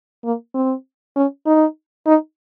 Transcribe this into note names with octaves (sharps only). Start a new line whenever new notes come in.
A#3
C4
C#4
D#4
D#4